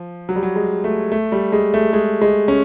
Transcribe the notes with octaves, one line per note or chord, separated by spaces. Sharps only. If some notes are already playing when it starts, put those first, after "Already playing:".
Already playing: F3
F#3
G3
F#3
G#3
A3
A3
G3
G#3
A3
G#3
G#3
C#4